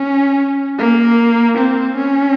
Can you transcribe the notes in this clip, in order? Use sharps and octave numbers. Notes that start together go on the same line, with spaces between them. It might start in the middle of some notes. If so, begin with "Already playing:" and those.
Already playing: C#4
A#3
C4
C#4